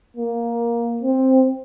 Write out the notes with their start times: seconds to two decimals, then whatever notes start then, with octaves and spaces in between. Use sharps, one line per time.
0.17 A#3
1.02 C4